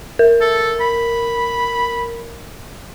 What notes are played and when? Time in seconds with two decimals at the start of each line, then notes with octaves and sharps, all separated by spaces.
0.19 A#4
0.41 A4
0.81 B5